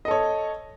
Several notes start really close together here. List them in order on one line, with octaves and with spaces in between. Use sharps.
D#5 A4 C#5